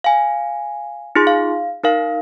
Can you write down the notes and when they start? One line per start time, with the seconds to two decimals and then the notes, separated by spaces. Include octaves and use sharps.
0.04 F5 G#5
1.15 D#4 F4 G#4 C6
1.27 F5
1.83 D#4 A#4 F5